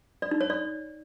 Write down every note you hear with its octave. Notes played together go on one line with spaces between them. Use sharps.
D5
D#4
C#5
D5